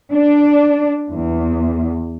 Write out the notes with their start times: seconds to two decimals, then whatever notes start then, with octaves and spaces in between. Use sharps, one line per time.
0.13 D4
1.12 E2